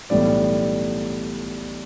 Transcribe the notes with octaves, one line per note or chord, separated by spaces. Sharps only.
B1 A2 E3 G3 D5